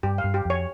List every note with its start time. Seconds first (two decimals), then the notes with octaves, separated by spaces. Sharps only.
0.03 G2 G4
0.18 F5
0.24 G2
0.34 G4
0.45 F2 C#5